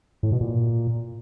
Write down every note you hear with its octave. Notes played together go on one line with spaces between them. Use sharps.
A2
B2
A#2